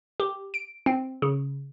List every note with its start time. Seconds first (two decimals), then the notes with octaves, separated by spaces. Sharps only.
0.20 G4
0.54 D7
0.86 C4
1.22 C#3